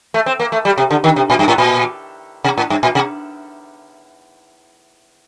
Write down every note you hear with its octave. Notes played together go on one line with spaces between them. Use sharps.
A3
C4
A#3
A3
G3
C3
D3
D#3
C3
A#2
G2
A2
A#2
C3
A2
G2
A#2
C3